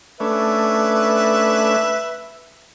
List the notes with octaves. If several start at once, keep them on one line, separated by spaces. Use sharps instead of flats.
A3 C#4 D4 B4 E5